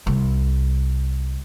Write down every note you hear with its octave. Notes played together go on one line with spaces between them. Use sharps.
C2